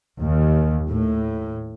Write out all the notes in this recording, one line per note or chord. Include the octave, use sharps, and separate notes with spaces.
D#2
A2